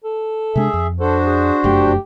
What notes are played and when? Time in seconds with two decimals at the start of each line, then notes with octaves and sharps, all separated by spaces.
0.04 A4
0.56 C3 G#3 D4 G#4 E5
0.74 F2
1.00 D4 F#4 A4 C5
1.26 G#4
1.64 F1 F#2 A3 G4